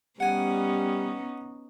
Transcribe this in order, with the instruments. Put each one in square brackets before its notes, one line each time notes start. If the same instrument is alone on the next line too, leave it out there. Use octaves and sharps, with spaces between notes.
[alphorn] G3 [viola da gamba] B3 C#4 D#4 [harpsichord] F#5 G#5